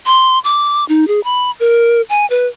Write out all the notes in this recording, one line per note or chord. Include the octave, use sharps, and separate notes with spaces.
C6
D6
D#4
G#4
B5
A#4
G#5
B4